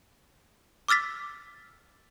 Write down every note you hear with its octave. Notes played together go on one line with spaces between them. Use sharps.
D6 E6 F6 A6 B6